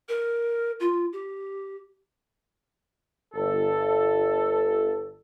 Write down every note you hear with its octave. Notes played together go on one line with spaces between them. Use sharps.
A#4
F4
G4
G1 A4